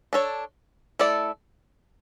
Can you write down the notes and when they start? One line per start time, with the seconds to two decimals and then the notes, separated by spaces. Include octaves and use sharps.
0.13 D4 A4 C#5
0.99 A3 E4 A4 D5